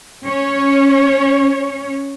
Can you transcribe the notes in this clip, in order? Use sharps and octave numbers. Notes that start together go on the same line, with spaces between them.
C#4 C#5